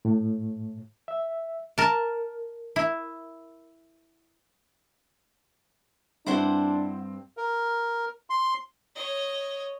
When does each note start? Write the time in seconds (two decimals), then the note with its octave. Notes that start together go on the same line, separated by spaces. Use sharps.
0.05 A2
1.08 E5
1.78 A#4 A5
2.76 E4
6.26 G2 C4 D4 E4 G4 C5 F#5
7.37 A#4
8.30 C6
8.95 C#5 D#5